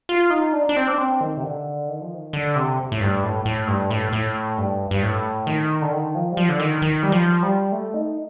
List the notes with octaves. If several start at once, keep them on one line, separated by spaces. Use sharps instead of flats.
F4
D#4
D4
D4
C4
D4
C4
D#3
C3
D3
D#3
F3
D#3
D3
C3
A2
G2
A2
A2
G2
A2
A2
G2
G2
A2
D#3
D3
D#3
F3
G3
F3
D3
D#3
D#3
G3
F3
G3
A3
D#4